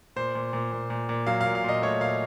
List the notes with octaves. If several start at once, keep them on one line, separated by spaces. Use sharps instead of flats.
A#2 C5
A#2
A#2
A#2
A#2
A#2
F#3 F5
F5
A#2
F5
A#2 D#5
A3 C#5
A#2 F5